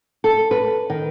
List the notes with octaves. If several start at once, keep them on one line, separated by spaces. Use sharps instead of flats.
A4
B4
D#3